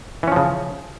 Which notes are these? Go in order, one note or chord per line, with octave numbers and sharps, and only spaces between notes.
C#3 E3 F3 C#4